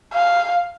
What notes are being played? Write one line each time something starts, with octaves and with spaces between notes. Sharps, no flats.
F5